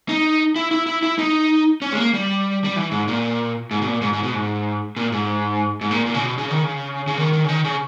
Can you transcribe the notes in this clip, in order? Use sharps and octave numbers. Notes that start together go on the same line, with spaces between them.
D#4
E4
E4
E4
E4
D#4
C#4
G#3
A#3
G3
G3
E3
G#2
A#2
G#2
B2
A#2
G#2
G#2
B2
G#2
A#2
G#2
G#2
A#2
A#2
C#3
B2
C#3
D#3
C#3
C#3
D#3
D#3
C#3
D#3
C#3